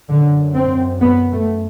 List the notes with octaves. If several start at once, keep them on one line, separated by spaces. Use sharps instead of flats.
F#2 D3
C4
B3
A3